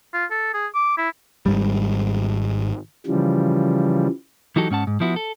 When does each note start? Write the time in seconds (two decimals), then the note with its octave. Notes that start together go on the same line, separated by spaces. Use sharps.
0.14 F4
0.31 A4
0.54 G#4
0.75 D6
0.98 E4
1.46 G#1 G#2 G3
3.07 C#3 E3 F3 G3
4.56 E3 F#3 D#4 F#4 G4 A4
4.71 G#2 C#4 F#5 A5
4.87 G#2
5.00 F3 B3 E4 F#4
5.16 A4